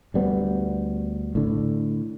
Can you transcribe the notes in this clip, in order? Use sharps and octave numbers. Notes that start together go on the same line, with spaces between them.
D2 G3 B3
A2 D3